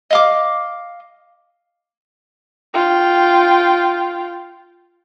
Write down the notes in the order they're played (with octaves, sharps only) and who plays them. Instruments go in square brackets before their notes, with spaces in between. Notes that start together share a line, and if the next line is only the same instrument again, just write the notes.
[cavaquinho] D#5 F5 D6
[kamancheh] F4 G5